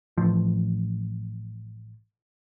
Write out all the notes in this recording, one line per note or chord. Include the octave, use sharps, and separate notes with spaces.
A1 F3